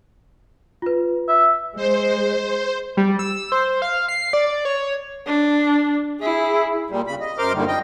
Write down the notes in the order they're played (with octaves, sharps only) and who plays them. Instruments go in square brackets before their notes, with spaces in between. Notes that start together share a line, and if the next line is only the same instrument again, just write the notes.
[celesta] F4 B4
[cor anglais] E5
[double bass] G#3 [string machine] C5
[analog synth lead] G3
E6
C5
F5
C7
D5
C#5
[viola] D4
E4 G#4
[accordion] A#2 G3
C#3 B5
D#5
F#2 A#4 C5 C6 D6 F6
F#2 A#2 D3 D#3 G3
D#5 G5